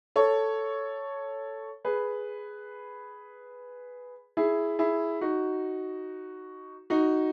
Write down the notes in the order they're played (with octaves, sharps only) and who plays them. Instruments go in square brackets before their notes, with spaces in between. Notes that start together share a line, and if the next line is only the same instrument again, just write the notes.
[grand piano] A4 C#5
G#4 B4
E4 G#4
E4 G#4
D#4 F#4
D#4 F#4